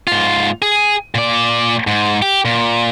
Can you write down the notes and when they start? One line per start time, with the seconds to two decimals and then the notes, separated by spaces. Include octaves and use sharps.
0.07 G#2 F4
0.62 G#4
1.15 A#2 D5
1.87 G#2
2.22 G4
2.45 A#2